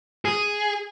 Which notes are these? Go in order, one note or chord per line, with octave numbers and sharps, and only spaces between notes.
G#4